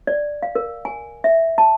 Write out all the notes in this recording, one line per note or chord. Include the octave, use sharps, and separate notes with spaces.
D5
F5
A#4
G#5
E5
A5